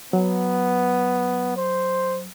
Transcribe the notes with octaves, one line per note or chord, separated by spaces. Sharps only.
F#3 B3
C5